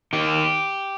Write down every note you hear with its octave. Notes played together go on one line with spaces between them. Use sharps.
D#3 G4